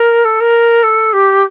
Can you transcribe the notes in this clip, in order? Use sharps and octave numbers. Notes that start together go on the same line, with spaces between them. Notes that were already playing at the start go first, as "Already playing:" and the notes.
Already playing: A#4
A4
A#4
A4
G4